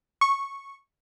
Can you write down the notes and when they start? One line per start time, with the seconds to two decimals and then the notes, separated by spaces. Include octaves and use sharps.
0.21 C#6